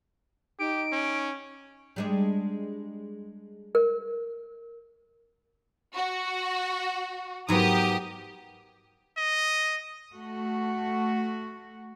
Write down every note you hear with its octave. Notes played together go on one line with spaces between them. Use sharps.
D#4 G4 D7
C#4
G3 G#3 D4
A#4
F#4
G#2 F#3 B3 G4 A#4 D#6
D#5
A3 F#4